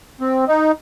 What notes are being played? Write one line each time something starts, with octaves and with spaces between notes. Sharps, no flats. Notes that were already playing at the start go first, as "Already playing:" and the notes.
C4
D#4